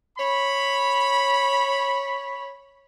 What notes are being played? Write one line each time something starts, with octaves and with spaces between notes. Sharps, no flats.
C#5 B5